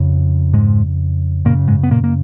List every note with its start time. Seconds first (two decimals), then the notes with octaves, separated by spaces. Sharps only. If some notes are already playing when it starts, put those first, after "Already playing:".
Already playing: F2 C#3
0.53 G#2 G#3
1.45 F#2 A#2 C#3 A#3
1.67 G#2 G#3
1.83 B3
1.91 A#2 A#3
2.04 A#3